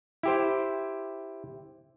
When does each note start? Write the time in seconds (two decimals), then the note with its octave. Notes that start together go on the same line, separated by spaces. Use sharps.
0.23 E4 G4 C5